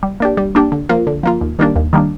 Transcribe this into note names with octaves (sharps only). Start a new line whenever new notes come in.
G3
A#3 D4 G4
G3
A#3 D4 G4
D3
F3 A#3 F4
D3
F3 A#3 F4
D#2
D#3 G3 A#3 D4
D#2
D#3 G3 A#3 D4